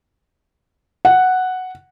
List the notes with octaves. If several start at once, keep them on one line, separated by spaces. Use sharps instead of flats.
F#5